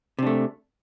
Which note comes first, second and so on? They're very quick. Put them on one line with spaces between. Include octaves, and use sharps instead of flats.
C3 D4 A3